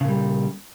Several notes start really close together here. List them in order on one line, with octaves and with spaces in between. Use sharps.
C#3 A#2 G3